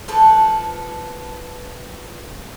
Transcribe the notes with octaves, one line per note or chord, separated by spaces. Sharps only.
F3 A4 B4